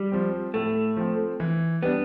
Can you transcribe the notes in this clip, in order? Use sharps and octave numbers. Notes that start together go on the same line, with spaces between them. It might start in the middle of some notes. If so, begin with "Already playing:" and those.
Already playing: G3
F3 C4
A2 A3
F3 C4
E3
G3 B3 D4